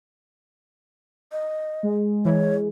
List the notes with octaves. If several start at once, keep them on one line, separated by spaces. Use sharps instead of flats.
D#5
G#3
E3 C#5